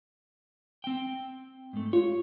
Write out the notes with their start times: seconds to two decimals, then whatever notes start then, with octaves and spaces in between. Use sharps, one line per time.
0.84 C4 G5
1.73 G#2 A3
1.93 F4 C#5